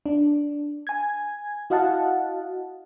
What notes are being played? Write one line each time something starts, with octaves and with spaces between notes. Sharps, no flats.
D4
G#5 G#6
E4 F#4 D#5 F5 F#5 A5